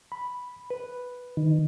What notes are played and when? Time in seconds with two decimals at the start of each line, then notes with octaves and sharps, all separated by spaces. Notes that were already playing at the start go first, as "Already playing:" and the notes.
0.12 B5
0.70 B4
1.37 D#3